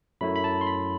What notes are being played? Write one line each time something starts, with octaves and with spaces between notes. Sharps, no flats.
F#2 F#3 A3 E4 B5
B5
A5
C6
B5